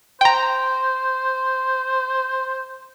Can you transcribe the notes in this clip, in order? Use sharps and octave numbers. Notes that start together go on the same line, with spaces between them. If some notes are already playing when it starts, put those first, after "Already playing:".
C5 G5 A#5